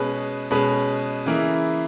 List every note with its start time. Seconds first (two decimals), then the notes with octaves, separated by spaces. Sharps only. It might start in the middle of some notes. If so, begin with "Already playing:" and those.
Already playing: B2 G#3 C#4 G#4 B4
0.51 B2 G#3 C#4 G#4 B4
1.26 C#3 E3 A#3 E4 G#4